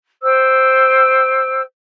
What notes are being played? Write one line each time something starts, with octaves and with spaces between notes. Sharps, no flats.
C5 G5 E6